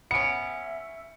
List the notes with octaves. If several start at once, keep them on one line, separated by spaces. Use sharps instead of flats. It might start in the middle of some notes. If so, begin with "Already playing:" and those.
B3 C#4 E5 C#7 D7